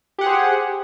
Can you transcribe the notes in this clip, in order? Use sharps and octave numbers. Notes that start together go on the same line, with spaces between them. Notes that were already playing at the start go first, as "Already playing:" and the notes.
G4 G#4 C5 F#5